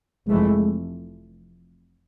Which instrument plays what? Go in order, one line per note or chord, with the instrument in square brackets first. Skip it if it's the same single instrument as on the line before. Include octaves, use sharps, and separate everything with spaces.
[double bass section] F1 F2 E3 A3 [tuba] G#3